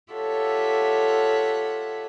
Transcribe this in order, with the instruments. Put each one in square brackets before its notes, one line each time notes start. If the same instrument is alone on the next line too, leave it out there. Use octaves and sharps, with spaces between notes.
[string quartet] F4 G4 A4 C#5 E5 F#5